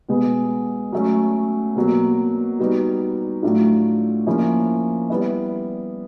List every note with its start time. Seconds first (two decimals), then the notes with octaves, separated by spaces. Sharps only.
0.09 B2 G#3 B3
0.92 F#3 A3 C#4
1.75 B2 F#3 A#3
2.59 G3 B3 D#4 F#4
3.43 A2 F#3 A3 D4 F4
4.27 F3 A#3 C#4 E4
5.10 G3 B3 E4